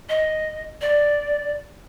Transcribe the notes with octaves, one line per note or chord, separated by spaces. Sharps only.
D#5
D5